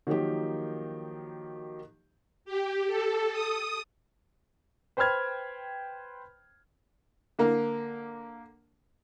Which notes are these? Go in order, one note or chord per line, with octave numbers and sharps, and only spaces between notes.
D#3 F3 F#3 A#3 D#4 G4
G4
A4
D#6
B4 C5 G5 B5 F6 G#6
D3 A#3 A#4